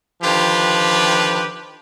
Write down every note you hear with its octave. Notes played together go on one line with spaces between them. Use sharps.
D3 D#3 F3 F4 G4 B4